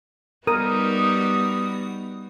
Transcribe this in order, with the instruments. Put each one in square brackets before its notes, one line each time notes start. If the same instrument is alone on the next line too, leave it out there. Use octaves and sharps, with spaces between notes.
[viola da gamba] G3 D#4 F#4 [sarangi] B3 [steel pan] A#4 [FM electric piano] D#6